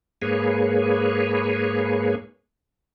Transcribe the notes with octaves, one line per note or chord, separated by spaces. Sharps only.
G#2 A#3 G#4 B4 C#5